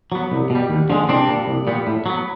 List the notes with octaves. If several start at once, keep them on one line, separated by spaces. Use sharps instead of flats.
F#3 B3
C2
B2 G3
D#2
D3 F3 G#3
C2 C4 D4
A#2 G3 A#3
C2
A#2 G3 B3
A2
F#3 B3